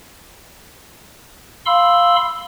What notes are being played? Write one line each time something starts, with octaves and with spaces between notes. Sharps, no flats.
F5 B5 C6 E6